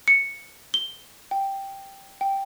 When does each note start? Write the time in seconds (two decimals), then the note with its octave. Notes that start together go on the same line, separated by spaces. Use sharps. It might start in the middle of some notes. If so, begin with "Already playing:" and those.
0.08 C#7
0.74 G7
1.31 G5
2.21 G5